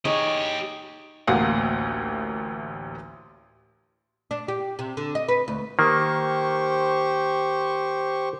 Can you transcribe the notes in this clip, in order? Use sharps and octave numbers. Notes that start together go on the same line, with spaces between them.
D#4 G4 G#4 C#5 D#5
A1 D2 A#3 F5 F#5
D4
G4
C3
D3
D#5
B4
D2
D#3 A#3 G4 C5 C#6